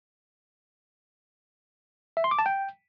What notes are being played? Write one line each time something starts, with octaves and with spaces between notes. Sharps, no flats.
E5
C6
D6
A5
G5